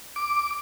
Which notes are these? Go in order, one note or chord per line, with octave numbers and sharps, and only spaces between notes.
D6